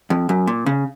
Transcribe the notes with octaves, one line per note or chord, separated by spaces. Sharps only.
F2
F#2
A#2
C#3